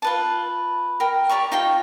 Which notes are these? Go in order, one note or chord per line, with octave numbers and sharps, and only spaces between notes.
F4 B4 A5
A#4 G5
G4 D5 A#5 C#6
D#4 F4 G5